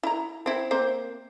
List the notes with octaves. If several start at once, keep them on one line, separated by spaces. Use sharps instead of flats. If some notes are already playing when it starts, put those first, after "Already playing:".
E4 A#5
C4 E4
A#3 C4 C5